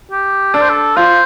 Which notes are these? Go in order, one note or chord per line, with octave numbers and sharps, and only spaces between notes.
G4
D4 A4
C5
A4
F4 C5